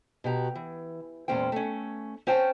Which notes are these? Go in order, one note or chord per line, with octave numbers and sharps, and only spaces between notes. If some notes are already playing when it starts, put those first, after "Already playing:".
B2 F#4 G4 A#5
E3
E2 A#2 G#3 C#4 C5 G5
A3 C#4
C#4 C5 C#5 G5 A5